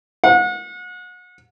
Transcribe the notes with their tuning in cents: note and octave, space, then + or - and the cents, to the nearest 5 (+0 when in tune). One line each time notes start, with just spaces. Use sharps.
F#5 -35